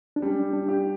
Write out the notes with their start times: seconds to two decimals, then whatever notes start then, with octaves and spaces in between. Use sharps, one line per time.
0.16 D4
0.22 G3 C#4
0.53 D4
0.68 G4